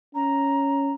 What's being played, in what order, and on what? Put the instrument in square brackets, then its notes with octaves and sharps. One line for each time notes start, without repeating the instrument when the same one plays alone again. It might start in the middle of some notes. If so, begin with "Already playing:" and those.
[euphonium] C#4 [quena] A#5